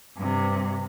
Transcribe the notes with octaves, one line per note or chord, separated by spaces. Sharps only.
G2 C3